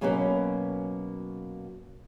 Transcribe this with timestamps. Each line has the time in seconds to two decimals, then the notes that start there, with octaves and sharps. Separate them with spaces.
0.01 B2 F#3 A#3 B3 C#4